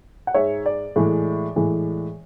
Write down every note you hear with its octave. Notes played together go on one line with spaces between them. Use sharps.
F#5
G#2 G#3 C#5 E5
D5
A2 E3 G#3
A2 E3 G#3